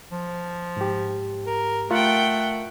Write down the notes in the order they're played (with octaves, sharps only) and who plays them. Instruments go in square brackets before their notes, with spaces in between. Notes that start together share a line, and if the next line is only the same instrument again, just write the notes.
[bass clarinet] F3
[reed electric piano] G#2 G4
[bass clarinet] A#4
[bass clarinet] A3 [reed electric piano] F4 A#4 [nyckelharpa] F#5 G5